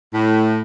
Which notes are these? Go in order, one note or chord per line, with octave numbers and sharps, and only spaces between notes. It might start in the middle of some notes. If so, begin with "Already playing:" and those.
A2